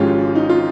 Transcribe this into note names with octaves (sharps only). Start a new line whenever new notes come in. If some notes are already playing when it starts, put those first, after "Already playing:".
Already playing: G#1 G#2 F3 G#3 C#4 F4 G4
D#4
F4